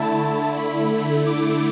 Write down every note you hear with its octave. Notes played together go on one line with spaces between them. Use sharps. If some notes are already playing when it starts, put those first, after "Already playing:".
Already playing: D3 A3 E4 A5
B5
D6